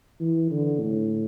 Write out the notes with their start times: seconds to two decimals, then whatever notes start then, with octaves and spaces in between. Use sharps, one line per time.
0.20 E3
0.50 D3
0.80 A2